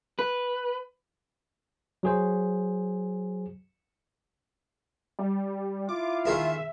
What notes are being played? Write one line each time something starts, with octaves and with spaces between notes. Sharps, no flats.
B4
F#3 G#4 C5
G3
E4 F4 D6
D#3 G#3 A#3 E5